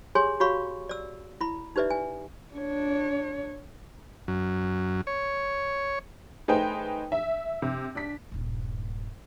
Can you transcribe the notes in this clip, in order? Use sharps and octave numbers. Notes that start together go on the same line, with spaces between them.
G4 G#4 C#5 G#5 C6
F#4 G4 C#5 F5 B5 C#6
D5 E6
E4 B5
D#4 G4 B4 D5 E5
G#5
D4 C#5
F#2
C#5
A3 D#4 G#4 B4 C5 G5
E5
C3
D4 B6
D#1 G2